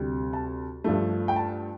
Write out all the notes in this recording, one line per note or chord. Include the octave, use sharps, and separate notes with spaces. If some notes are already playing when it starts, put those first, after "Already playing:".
Already playing: D2 C3 G3
A5
G2 F3 A3
G5
A5